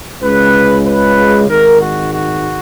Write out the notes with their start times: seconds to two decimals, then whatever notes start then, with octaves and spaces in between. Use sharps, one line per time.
0.22 C#2 C#3 G#3 B4
0.86 B4
1.48 G#1 G#2 D#3 G#3 A#4
1.80 F#4
2.11 F#4